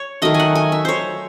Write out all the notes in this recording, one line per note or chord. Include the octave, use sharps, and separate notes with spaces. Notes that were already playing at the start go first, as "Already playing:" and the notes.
Already playing: C#5
D#3 F#3 A3 D#5
G#5
F#5
G#5
E5
C5 C#5